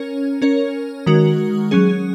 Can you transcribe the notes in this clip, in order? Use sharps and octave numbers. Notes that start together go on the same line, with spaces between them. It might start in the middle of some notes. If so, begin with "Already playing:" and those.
Already playing: C#4 A#4 C#5
C#4 A#4 C#5
D#3 G#3 F#4 A#4
F#3 C#4 G#4